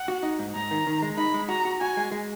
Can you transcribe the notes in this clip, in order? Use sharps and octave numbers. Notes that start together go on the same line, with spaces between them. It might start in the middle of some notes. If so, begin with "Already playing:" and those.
Already playing: F#5
F#4
D#4
G#2
G#2 A#5
D#3
D#3
G#3
D#4 B5
G#3
F#4 A#5
F#4
F#4 G#5
G#3
G#3